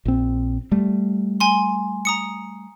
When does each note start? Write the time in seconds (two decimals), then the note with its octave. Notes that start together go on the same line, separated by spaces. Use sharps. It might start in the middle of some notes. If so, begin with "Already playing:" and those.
0.05 A#1 C4
0.72 G3 A3
1.40 G#5 C6
2.05 A#5 D#6 C#7